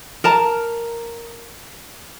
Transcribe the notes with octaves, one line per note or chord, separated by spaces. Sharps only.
A#4 A5 A#5